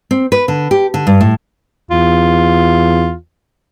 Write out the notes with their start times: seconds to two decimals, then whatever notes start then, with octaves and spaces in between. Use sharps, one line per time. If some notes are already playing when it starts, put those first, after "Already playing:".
0.11 C4
0.32 B4
0.48 D3
0.71 G4
0.94 D3
1.07 G2
1.20 A2
1.91 E2 F4